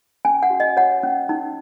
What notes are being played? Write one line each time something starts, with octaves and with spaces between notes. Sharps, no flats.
C#4 G#5
F#5
F#4
D#5
C#5 F#5
C#4
D#4